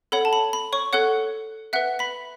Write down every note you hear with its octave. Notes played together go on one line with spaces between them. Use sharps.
A4 C#5 F#5 B5
A5
B5
B5
C#5 C#6
A4 C#5 F#5 F#6
B4 E5 F#5 F#6
B5 B6